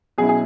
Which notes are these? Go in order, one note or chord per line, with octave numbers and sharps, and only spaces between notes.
B2 F#3 C#4 E4 G#4
G#4